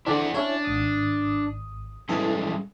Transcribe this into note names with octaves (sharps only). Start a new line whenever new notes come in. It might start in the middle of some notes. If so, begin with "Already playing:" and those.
D3 C4 D4 E4 G#4 F#5
C#4 D4 E4 C#5
G#1 D#6
E3 G3 G#3 C#4 G#4 A4